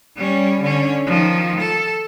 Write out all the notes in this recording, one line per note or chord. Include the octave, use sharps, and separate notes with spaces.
G3 C#4
D3 C#4
D#3 F3
A4